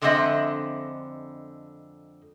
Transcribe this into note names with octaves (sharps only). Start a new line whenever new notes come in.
F2 D3 G#3 C4 D#5 E5